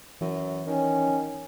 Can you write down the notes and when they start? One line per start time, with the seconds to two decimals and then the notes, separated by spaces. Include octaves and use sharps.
0.21 F#2 E3
0.67 D#3 C#4